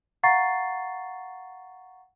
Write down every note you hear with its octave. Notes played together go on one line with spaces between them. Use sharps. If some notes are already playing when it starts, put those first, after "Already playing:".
F5 F#5 A#5 C#6 A6 C7